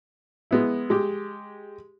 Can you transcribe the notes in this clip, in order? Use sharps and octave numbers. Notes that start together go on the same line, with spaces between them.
G#3 B3 E4
G#3 G4